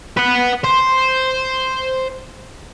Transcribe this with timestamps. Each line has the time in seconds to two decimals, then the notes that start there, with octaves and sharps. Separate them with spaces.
0.17 B4 F#5
0.64 C5